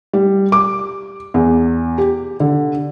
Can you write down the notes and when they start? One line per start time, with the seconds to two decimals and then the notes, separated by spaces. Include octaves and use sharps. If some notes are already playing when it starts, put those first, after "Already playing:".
0.13 G3
0.52 D6
1.34 E2
1.98 G4
2.40 D3